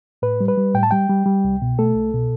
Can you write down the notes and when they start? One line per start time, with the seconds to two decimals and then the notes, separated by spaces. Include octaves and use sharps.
0.22 A2 B4
0.40 G3
0.48 B4
0.57 G3
0.74 A2 G5
0.83 A5
0.91 G3 G5
1.09 G3
1.26 G3
1.44 C2
1.62 B2
1.79 A3 A4
1.95 C2
2.14 B2